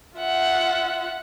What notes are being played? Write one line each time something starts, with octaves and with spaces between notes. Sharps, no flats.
F4 E5 F#5